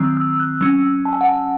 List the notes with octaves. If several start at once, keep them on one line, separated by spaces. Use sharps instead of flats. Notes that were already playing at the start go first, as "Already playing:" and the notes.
Already playing: D#3 F#3 C4 E6
E6
F#6
F#3 C#4 E6
A5
G#5
F#5
G#5